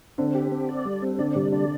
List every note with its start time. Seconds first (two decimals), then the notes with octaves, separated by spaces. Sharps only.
0.18 D3 C4
0.35 G4
0.52 C4
0.69 D5
0.85 G3
1.02 C4
1.19 D3 D5
1.35 C3 G3
1.52 D3 D5